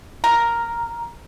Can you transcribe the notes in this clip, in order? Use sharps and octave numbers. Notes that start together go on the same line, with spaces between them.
A#4